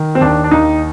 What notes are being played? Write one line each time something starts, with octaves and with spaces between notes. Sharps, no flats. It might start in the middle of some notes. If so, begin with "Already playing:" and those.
Already playing: D#3
C4
D#2 D4
D4
D#2 D#4